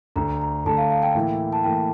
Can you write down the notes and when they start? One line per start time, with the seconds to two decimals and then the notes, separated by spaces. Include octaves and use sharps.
0.16 D2 D3 A3 A#5
0.41 A#5
0.65 D2 D3 A3 A5
0.77 F5
0.91 F5
1.03 G5
1.15 A2 E3 A#3 E4
1.53 A5
1.64 A2 E3 A#3 E4 G5